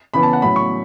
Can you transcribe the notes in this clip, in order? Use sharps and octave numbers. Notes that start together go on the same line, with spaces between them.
C#3 E3 B3 B5
A5
F#5
A2 F#3 C#4 B5
C#6